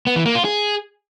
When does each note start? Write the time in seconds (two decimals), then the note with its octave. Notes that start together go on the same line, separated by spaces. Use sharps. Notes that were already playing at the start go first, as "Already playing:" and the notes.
0.07 B3
0.16 E3
0.26 A#3
0.35 F4
0.45 G#4